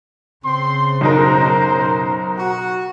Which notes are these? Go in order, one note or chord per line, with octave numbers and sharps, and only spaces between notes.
C#3 C4 C5 C6
B1 F#2 D#4 A#4 C5
F#4